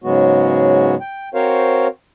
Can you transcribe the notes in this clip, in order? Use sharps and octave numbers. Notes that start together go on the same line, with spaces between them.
G#2 C#3 F#3 G#3 B3 F#4
G5
C4 F#4 A#4 C5 C#5 F5